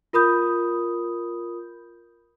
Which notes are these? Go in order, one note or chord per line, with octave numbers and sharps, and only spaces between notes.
F4 A#4 B5 D#6 G6